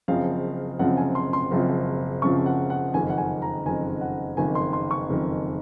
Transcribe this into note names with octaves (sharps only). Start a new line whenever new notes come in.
F#1 F#2 C#3 F3 C4 F5
F#1 F#2 C#3 F3 C4 F#5
G#5
C6
C6
F#1 F#2 C#3 F3 C4
F#1 F#2 C#3 F3 C4 C#6
F#5
F#5
F#1 F2 D#3 G#5
F#5
G#5
A#5
F#1 F2 D#3 G#5
F#5
F#1 F2 D#3 G#5
C6
C6
C#6
F#1 F2 D#3